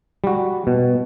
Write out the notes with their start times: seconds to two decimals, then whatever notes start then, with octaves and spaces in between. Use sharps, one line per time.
0.24 G3 F#4
0.67 B2